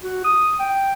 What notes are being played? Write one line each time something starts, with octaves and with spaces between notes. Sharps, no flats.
F#4
D#6
G5